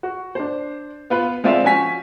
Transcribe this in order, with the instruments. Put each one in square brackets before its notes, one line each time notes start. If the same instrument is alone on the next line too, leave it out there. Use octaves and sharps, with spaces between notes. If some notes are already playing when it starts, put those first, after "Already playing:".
[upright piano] F#4
D4 C5
B3 F4 B4
G#3 C4 F4 D5 E5 F5
F3 C#4 F#4 G#5 B6